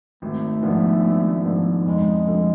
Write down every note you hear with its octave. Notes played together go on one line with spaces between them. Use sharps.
G#1 A3
G#2 F3 B3 D4
G#1
G#2 F3 B3 D4
F2 G#3
D3 F3 A3